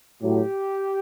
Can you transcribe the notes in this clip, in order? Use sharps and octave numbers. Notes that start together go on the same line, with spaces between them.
A2 F#3 G4